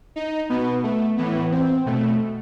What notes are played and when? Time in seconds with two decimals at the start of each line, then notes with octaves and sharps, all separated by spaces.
0.16 D#4
0.49 B2 B3
0.83 A3
1.17 A2 E3 B3
1.52 C4
1.86 B2 A3